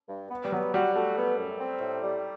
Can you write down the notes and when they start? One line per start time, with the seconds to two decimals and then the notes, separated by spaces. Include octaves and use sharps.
0.09 G2
0.30 B3
0.45 G3
0.52 F#3 B3
0.74 G3 F#4
0.94 A3 F#4
1.17 B3
1.37 F#2
1.60 C4
1.80 A2
2.02 G3